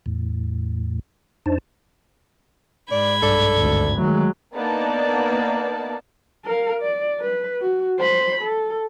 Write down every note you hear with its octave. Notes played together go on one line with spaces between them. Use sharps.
E2 A2
F2 D4 D#4 C5 A5
G#2 D5 B5 G#6
B1 G2 A4 D5
G#1 D2
D#3 F#3 G#3 A3
A#3 B3 D4 D#4 D5 A5
A#4 F5
D5
B4
F#4
C5 B5
A4